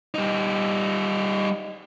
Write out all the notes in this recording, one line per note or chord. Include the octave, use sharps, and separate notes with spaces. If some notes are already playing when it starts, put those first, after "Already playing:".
G3 D#4